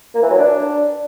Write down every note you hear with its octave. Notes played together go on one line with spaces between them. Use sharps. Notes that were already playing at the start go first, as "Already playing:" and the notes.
A#3
E3
F#3
D4